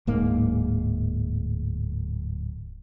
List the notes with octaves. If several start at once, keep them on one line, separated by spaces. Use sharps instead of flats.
D1 G#2 A#3